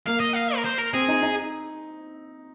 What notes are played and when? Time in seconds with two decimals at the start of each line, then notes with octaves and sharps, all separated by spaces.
0.06 A#3 F5
0.20 D#5
0.33 F5
0.56 A#4
0.65 C5
0.78 A#4
0.93 C4 G#4
1.08 D#4
1.22 D#4